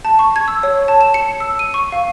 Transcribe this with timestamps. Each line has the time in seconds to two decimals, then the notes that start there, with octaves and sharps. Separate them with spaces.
0.05 A5
0.19 C#6
0.36 G#6
0.48 E6
0.63 C#5
0.88 A5
1.01 E7
1.14 C#7
1.40 E6
1.59 D#7
1.74 C#6
1.92 F5